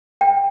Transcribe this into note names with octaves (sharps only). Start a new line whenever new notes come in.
G5